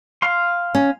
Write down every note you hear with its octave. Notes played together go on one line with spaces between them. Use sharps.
F5 C6
C#4